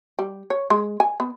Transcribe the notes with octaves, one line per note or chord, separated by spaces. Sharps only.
G3
C#5
G#3
G#5
B3